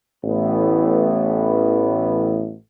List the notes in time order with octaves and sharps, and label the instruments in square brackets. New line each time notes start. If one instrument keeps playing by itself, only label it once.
[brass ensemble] A1 A2 E3 B3 E4